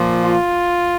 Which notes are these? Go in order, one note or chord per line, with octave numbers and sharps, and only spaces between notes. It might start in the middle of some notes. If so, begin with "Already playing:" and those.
Already playing: A#2 F3
F4